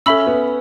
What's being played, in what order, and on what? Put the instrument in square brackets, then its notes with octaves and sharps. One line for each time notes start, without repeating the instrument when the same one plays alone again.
[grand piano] C#4 [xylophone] A4 E5 B5 E6
[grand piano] B3